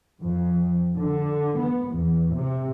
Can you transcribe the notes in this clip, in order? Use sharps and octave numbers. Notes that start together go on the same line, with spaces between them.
F2
D3
B3
E2
C3